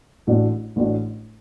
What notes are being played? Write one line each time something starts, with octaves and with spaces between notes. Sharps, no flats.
A1 A2 A3 D4 F#4
A1 A2 A3 D4 F#4